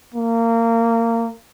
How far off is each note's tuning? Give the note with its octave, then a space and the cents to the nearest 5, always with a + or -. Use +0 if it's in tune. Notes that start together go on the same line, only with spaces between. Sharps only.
A#3 -25